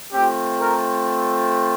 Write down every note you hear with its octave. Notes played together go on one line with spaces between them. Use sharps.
A3 C4 F4 G4
A#4